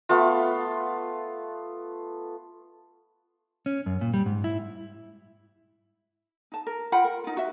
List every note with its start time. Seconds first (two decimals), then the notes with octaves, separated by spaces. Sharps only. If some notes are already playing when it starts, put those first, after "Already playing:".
0.09 A3 B3 F4
3.66 C#4
3.86 F#2
4.01 A#2
4.14 G3
4.26 G#2
4.44 E4
6.52 D#4 A5
6.67 A#4
6.92 F4 F#5 G5 B5
7.04 A#4
7.24 D#4 F4
7.37 F#4 E5